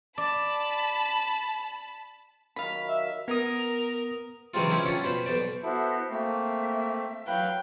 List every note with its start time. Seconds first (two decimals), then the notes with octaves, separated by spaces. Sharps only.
0.18 D5 A5 B5
2.56 D#3 F#3 F5 B5
2.88 E5
3.28 B3 A#4 D#6
4.54 C#3 E3 F#3 G#3 C4 F4
4.69 F3 C4 C#4 E4
4.86 C#4 D4 F4 F#5
5.04 B2 C5 B5
5.26 B1 B2 C5 D5
5.63 B3 E4 F#4 A4 C5 E5
6.10 A3 A#3 C4 E5
7.27 F#3 B4 F5 G5 F#6